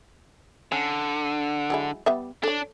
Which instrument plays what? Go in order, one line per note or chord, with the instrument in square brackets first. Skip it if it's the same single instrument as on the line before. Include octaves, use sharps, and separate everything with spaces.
[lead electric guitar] D3 [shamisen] C#4
[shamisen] F#3 G#3 E4
G3 B3 E5
[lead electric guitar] D4 [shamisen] A4 C#5